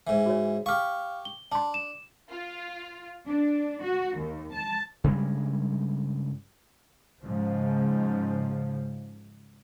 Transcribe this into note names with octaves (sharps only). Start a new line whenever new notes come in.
G#2 E3
F#4 C#5
G4 F5 C#6 F6
G7
D4 A5 C6
E7
F4
D4
F#4
D#2
A5
G2 C#3 G3 G#3
G#2 C#3 F3